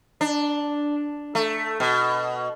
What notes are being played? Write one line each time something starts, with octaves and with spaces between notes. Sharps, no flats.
D4
A3
B2